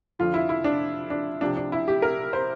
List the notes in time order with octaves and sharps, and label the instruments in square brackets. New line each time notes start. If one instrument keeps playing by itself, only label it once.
[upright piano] F2 D3 F3 F4
E4
E4
D4
D4
C2 C3 F3 D4
D4
E4
G4
A#4
C5